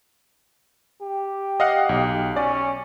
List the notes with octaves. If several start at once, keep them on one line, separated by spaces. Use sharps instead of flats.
G4
D#5 F5 F#5
B1
C#4 D5